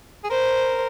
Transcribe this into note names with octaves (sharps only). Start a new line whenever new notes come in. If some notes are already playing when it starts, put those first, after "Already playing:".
G#4
A#4 C5